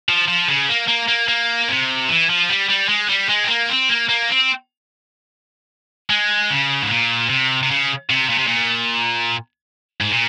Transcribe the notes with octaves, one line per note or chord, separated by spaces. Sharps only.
F3
F3
C#3
A#3
A#3
A#3
A#3
C3
E3
F3
G3
G3
G#3
G3
G#3
C4
A#3
C4
A#3
A#3
C4
G#3
C#3
G#2
A#2
C3
C3
C#3
C3
A#2
C3
A#2
G#2
A#2